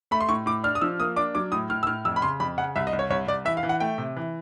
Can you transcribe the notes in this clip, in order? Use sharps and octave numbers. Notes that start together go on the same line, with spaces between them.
A3 B5
C6
A2 C#6
A2 D6
D4 F6
D#6
F3 E6
A#3 D#6
D4 D6
F#3 D6
A2 D#6
A2 F6
E6
A2 F6
F2 E6
B5
C#3 C6
F2 B5
C#3 F#5
C2 E5
D#5
C2
C#5
C2 C#5
C2 D5
E3 E5
F5
E3
F#5
A3 G5
C3
E3